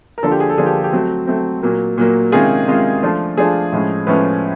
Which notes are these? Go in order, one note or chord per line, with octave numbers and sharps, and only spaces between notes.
A#4
D3 F3 A#3 D4 F4 A4
G4
G#4
A4
D3 F3 A#3 D4 F4 G#4
G4
G4
F#3 A3 C4
F#3 A3 C4
A#2 F#3 A#3
A#2 F#3 A#3
C3 D#3 G#3 C#4 F4 G#4
C3 D#3 G#3 C#4 F4
F3 A3 D4 F4
F3 A3 D4 F4 G#4
A2 F3 G#3 C#4
A2 F3 G#3 C#4 B4